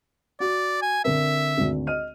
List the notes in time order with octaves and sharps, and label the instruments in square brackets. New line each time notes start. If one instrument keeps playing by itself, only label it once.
[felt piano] F#4 [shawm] D5
[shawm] G#5
[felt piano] D3 C4 A#4 [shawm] E5
[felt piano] G#1 D2
D#5 F6 D#7